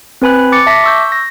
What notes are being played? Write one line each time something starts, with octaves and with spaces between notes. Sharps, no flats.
C4 B4 G#5 B5 F#6
D6 A6 C#7
E5 A5 D6 A#6 B6
C#6 E6 G6
A#6